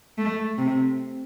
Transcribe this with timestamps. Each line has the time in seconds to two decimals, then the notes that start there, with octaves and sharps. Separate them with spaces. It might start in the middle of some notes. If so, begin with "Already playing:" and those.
0.18 A3
0.58 C3